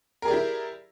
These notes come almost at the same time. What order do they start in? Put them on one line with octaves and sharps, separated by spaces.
A#4 G#4 D5 G4 E4